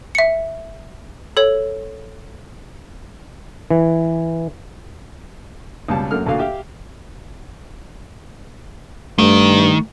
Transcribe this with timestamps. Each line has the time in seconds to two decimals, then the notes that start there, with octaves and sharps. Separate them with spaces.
0.15 E5 C#7
1.37 A4 C#5
3.71 E3
5.88 C#2 B2 G3 A5
6.11 F#2 A3 A#3 F6
6.26 D2 A#2 F#4 A4 F5
6.39 G4 E5 F5
9.18 G2 D#3 A3